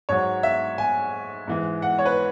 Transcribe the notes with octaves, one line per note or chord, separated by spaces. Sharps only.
G#2 F#3 C#5
E5
G#5
G#2 E3 G#3
F#5
C#5
B4